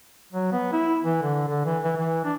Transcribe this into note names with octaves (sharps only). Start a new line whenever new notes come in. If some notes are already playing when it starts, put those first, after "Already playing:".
F#3
B3
E4
E3
D3
D3
E3
E3
E3
D4